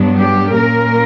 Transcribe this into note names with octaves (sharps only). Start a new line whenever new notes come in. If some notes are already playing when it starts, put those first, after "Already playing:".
Already playing: G2 F#3 B3 D4
G4
A#2 A#3 C#4 A#4